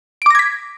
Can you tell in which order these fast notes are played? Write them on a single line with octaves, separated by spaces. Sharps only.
D7 D6 A#6 G#6 B6